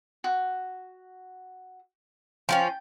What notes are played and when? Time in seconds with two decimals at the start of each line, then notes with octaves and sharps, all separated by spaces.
0.24 F#4
2.49 F3 C4 C#4 G5